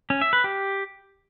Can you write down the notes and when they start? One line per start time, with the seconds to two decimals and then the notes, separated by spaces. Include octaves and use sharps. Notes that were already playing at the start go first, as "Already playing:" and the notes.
0.10 C#4
0.21 E5
0.33 B4
0.44 G4